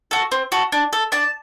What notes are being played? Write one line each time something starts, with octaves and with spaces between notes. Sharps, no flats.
F#4 A4
C4
F#4 A4
D4
A4
D4 A5